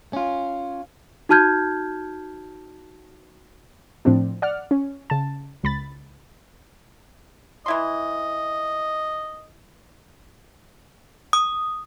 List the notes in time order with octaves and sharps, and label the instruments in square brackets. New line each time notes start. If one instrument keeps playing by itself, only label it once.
[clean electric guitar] C#4 F4
[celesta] D#4 F#4 A5 F6 G6 G#6
[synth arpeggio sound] A2 F3 C4 D4
D5 F#5 F6
C#4
C#3 A5
C#2 B5 A6
[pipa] E3 E4 C6 [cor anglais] D#5
[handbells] D#6